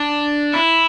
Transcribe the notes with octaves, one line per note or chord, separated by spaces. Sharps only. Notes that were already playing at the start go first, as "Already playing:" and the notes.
Already playing: D4
E4